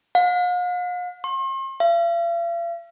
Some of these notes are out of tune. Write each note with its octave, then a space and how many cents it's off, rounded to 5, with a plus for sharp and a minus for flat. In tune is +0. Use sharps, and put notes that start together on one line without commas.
F5 +45
C6 +45
F5 -45